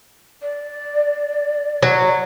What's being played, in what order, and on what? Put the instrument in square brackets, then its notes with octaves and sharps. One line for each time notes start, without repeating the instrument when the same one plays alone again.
[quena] D5
[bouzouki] F#3